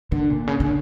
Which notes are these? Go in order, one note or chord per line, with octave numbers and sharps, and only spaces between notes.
D3
A#2
C#3
D3